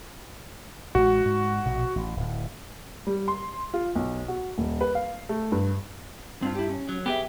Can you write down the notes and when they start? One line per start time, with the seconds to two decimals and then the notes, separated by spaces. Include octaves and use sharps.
0.95 A1 G#3 F#4
1.25 G#2
1.65 A#1 B2
1.96 A1
2.17 D1 A2
3.07 G3
3.28 C6
3.74 F4
3.95 B1
4.28 F#4
4.58 D#1
4.81 B4
4.95 F5
5.29 A3
5.52 G2
6.42 G2 C4 D4 F4
6.55 E4 G4
6.69 C#4
6.89 F#3
7.06 B3 G4 G#4 E5